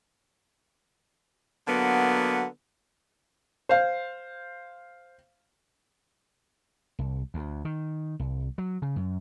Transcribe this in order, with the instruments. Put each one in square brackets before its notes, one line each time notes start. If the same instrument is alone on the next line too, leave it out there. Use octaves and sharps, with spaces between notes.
[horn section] D3 F#3 A#3 B3
[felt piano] C5 F5
[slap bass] C2
D2
D#3
C2
F#3
C#3
F#2